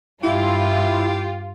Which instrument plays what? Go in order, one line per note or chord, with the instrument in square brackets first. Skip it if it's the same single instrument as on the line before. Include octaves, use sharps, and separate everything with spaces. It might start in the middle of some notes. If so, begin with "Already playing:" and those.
[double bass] G2 [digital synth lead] E4 [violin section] F4 [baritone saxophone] G4